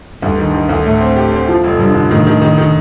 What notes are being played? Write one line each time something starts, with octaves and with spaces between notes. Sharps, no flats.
D2 G2
D#3
D#3
D2
A2 A3
C4
G4
C4
F3
F1
F1 G2
D3
A2 D#3
D#3
D#3
D#3